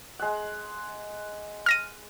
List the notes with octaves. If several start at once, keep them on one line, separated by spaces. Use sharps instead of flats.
G#3 F#5
F6 A#6 D#7